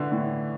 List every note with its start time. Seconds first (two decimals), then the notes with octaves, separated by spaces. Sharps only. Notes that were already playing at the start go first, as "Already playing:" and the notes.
Already playing: D3 E3
0.12 A2